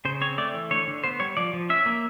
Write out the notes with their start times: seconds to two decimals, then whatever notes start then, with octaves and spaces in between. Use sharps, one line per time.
0.05 C#3 C5
0.21 C4 C#5
0.38 A3 D5
0.54 E3
0.71 D3 C#5
0.87 D3
1.04 B3 C5
1.20 G3 C#5
1.37 F3 D5
1.54 F3
1.70 C#4 E5
1.86 A#3